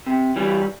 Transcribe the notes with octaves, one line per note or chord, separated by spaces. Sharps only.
C3
E3 G3